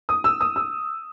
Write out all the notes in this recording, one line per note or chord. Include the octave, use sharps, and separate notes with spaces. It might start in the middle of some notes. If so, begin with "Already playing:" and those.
D#6
E6
D#6
E6